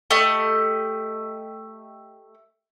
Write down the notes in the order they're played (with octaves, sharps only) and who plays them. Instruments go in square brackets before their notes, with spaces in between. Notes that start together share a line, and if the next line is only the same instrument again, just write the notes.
[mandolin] A3 G4 D#5